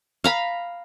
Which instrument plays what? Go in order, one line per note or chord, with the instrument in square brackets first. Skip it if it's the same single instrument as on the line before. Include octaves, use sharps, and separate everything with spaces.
[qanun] F5 A#5 B5